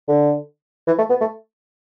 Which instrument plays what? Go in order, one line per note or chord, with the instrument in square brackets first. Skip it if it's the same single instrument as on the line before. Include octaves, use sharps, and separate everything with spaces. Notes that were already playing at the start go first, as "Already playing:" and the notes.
[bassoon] D3
E3
A3
B3
A3